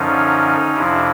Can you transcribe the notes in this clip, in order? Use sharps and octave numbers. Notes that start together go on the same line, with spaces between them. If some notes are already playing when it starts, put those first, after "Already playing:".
Already playing: F#2 D3 F3 C#4 D#4
F2 C3 F3 D4 E4